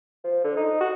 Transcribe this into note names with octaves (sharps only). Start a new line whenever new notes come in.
F3
D3
D#4
F#4